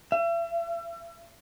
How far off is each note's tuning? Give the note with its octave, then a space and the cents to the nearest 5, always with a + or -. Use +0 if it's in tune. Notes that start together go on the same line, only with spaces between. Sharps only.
E5 +40